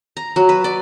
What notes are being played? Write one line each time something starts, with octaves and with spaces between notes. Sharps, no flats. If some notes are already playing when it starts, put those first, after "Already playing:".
A#5
F#3
B4
D5